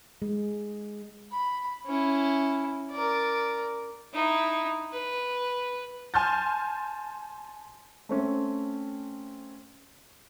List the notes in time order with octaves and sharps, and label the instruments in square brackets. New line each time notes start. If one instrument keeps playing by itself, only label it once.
[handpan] G#3
[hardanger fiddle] B5
C#4 E4
A#4 D5
[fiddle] D#4 E4
B4
[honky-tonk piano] G#5 A5 C6 F6 G6 A6
[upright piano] A3 C4 C#4